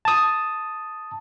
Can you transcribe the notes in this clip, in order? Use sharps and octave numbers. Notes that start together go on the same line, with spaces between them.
A5 D#6